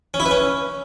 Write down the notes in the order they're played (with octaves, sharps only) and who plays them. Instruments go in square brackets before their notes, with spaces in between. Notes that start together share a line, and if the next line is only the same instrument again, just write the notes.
[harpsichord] C#4
E4
B4
C#4